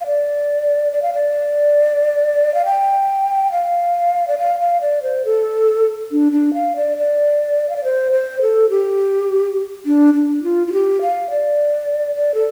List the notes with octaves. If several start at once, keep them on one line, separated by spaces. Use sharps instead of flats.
F5
D5
D5
F5
D5
F5
G5
F5
D5
F5
F5
D5
C5
A4
D4
D4
F5
D5
D5
F5
D5
C5
C5
A4
G4
D4
D4
F4
F4
G4
F5
D5
D5
A4